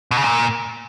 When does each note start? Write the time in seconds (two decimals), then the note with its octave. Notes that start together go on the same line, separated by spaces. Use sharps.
0.11 B2
0.17 C#3
0.23 A#2